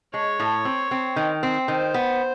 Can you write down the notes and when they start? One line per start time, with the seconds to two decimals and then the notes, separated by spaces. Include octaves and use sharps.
0.14 G#3 C#5
0.40 A2
0.65 C4
0.91 C4
1.16 D#3
1.43 C4
1.68 D#3 C5
1.94 B3